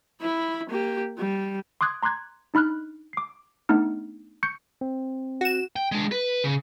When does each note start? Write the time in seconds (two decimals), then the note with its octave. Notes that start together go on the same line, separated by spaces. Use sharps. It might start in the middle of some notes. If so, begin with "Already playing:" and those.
0.21 E4 B5
0.69 A#3 G4
1.17 G3
1.81 C6 D6 D#6 F#6 G#6
2.03 A#5 C6 D6 F#6 G#6
2.54 D4 D#4 B5 F6 F#6
3.13 D6 C7
3.69 A3 B3 D4 D#4 F6
4.43 C#6 G6 C#7
4.81 C4
5.41 F#4 E7
5.76 G5
5.92 G#3 D4
6.12 B4
6.44 C#3